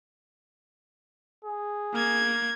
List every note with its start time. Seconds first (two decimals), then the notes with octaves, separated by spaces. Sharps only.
1.45 G#4
1.93 A#3 G#6